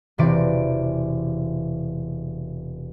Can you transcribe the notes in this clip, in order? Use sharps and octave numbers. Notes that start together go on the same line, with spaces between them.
E1 C3 E3 C4 D5 D7